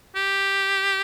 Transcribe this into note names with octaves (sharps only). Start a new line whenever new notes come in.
G4